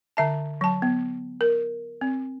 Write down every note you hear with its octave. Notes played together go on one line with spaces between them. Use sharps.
D3 E5 A5
F#3 A5
B3
A#4
C4